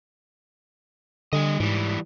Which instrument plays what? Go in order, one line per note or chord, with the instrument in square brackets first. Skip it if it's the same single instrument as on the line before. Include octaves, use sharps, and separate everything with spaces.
[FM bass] D3 [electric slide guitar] G3 D#5
[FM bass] G#2 [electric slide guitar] E3 G3